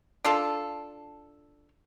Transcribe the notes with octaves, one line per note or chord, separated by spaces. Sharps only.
D4 F4 A4